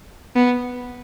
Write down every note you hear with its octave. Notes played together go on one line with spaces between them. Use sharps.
B3